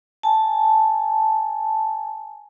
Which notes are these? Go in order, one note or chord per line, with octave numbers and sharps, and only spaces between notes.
G#5 A5